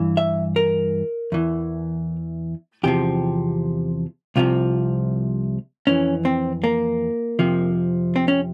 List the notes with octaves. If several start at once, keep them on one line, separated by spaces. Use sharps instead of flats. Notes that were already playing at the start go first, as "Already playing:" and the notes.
Already playing: G2 E3
E5
A#4
E2 E3
E2 C3 F3 G4
C2 C3 F3 F4
F2 E3 C#4
C4
A#3
F2 C3 F3
C4
C#4